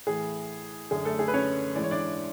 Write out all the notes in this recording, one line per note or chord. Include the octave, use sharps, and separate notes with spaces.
A2 E3 G#4
F#2 D3 G#4
A3 A4
G#4
B4
C#4 C#5
G#2 E3 D5
C#5
D4 D5